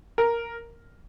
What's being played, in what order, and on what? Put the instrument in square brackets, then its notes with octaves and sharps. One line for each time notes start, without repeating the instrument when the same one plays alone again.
[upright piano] A#4